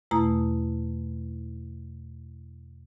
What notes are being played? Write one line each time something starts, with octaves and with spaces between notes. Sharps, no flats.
E2 B2 A3 E4 A#5 D#6